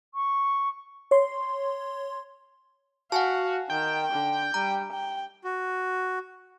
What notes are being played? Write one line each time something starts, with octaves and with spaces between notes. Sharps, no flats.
C#6
C#5 C6
F#4 F5 F#5 G#5 A5
D#3 G5
D3
G3 A#5
G5
F#4